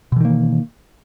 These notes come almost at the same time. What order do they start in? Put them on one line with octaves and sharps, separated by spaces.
B2 E3 D#3 A#3